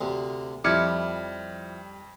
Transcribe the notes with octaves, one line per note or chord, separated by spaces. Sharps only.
D2 C3
F2 F3 G3 E4 D6 F6 G#6 C#7